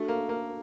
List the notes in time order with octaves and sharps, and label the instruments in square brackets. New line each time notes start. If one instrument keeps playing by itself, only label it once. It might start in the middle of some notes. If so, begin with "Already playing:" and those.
Already playing: [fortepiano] A3 [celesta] D4 F#4 A4
[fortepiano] A#3
A#3